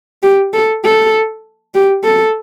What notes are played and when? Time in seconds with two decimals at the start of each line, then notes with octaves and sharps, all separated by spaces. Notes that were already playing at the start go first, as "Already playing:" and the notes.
0.23 G4
0.53 A4
0.84 A4
1.74 G4
2.04 A4